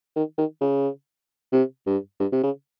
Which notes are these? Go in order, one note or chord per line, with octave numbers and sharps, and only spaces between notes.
D#3
D#3
C#3
C3
G2
G2
C3
C#3